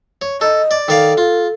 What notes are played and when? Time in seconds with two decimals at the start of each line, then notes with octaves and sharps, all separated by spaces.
0.22 C#5
0.41 A4 D#5
0.71 D5
0.88 D#3 A4 D5 F5
1.17 F4